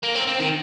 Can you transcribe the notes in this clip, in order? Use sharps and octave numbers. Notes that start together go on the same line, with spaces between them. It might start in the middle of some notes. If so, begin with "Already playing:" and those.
A#3
C4
C4
D#3